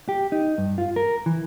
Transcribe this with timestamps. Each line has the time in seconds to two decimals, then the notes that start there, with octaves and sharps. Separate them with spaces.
0.09 G4
0.32 D#4
0.58 G2
0.78 F4
0.96 A#4
1.26 E3